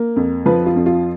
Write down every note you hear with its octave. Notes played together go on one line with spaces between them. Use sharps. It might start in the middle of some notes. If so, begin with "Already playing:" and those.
Already playing: A#3
F2
F3 B4
F4
F2
F4